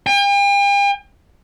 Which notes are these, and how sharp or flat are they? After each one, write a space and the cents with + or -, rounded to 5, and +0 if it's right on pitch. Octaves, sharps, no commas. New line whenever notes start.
G5 +45